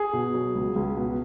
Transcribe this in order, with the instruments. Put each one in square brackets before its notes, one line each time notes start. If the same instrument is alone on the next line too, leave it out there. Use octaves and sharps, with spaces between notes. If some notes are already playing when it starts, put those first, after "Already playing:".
Already playing: [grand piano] G#4
B2
F#3
C#2
C#2
B2